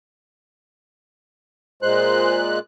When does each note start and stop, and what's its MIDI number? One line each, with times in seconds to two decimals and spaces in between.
1.82 2.59 46
1.82 2.59 56
1.82 2.40 72
1.82 2.59 90